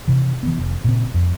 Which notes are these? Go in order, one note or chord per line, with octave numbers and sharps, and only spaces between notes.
C3 E3
E3 B3
F1
A#2 C#3 C4
F2